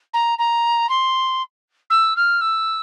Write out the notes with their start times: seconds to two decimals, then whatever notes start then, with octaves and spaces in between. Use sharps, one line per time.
0.13 A#5
0.38 A#5
0.89 C6
1.90 E6
2.16 F6
2.41 E6